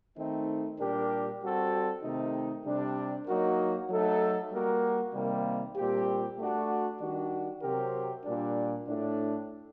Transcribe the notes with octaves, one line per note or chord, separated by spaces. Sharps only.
D#3 A3 C4 D#4
A#2 G3 D4 G4 A#4
G3 C4 F#4 A4
C3 D#3 A3 C4 D#4
C3 G3 D4
F#3 A#3 D#4 F#4 A#4
F#3 A3 D#4 A4
G3 A#3 F#4 A#4
C3 D#3 G3 A#3
A#2 G3 C4 G4
A3 D4 F#4
D#3 G3 D4 F#4
C3 F#3 C4 G4 A#4
A#2 G3 D4
A2 A3 D4